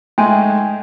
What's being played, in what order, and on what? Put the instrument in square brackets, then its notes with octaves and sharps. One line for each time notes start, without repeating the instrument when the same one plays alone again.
[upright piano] G#2 G#3 A3 [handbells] G5 G#5